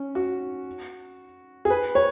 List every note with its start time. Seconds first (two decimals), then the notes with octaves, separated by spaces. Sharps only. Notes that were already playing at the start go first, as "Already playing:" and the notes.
Already playing: C#4
0.15 F#4
1.65 G#4
1.70 B4
1.95 C#5